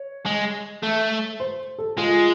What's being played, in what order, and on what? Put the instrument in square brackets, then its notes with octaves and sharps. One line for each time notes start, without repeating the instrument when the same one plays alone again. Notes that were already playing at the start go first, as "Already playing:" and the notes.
Already playing: [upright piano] C#5
[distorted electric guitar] G#3
A3
[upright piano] C5
A4
[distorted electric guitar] G#3 [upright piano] F4